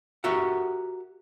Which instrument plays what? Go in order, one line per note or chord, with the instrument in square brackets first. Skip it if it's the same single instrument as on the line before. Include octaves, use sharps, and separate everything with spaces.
[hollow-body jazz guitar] F#4 G4 A#4 E5 F#5